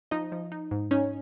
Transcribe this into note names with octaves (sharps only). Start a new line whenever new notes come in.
F3 D#4 D#5
F3
D#4
G#2
C#4 D#4 C#5